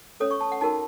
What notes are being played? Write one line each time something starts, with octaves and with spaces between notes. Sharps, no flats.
C#4 A4 C#5 D#6
C#6
A5
F#5
D#4 F#4 A#4 A5